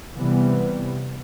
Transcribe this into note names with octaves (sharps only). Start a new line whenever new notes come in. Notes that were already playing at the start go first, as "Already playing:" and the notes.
C3 E3 G3 B3